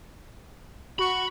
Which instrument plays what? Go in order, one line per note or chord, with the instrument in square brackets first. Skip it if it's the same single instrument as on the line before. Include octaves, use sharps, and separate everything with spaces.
[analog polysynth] F#4 C#6 [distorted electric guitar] B5